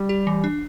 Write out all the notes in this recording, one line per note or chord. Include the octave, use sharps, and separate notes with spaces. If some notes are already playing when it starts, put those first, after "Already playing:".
Already playing: G3
G4
E3
D4